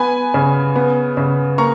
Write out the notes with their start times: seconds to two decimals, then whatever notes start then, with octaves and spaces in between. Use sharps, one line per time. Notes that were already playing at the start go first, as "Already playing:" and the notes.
Already playing: B3 G#5 B5
0.34 C#3
0.76 B3
1.17 C#3
1.58 A#3 A#5 C#6